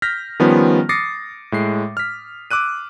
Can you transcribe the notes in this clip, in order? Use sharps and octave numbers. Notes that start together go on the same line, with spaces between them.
F6 G6 A#6 B6
D#3 F3 G3 B3 C#4 F4
D6 D#6 A6 A#6 C7 C#7
A2 G#3 C7
F6 B6
D6 E6 F#6 D#7